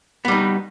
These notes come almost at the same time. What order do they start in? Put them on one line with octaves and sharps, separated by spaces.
B3 G3 D#4